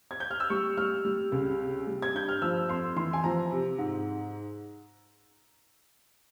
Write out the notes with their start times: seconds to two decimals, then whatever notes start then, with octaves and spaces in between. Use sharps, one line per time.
0.11 G#6
0.20 G6
0.31 F6
0.40 E6
0.50 G3 C#6
0.77 G3 F6
1.05 G3
1.32 C#2
1.60 C3
1.87 G3
2.02 G#6
2.14 G2 G6
2.29 F6
2.42 F3 E6
2.69 F2 C6
2.96 E3 C6
3.13 G#5
3.24 F3 A#5
3.51 C3
3.78 G#2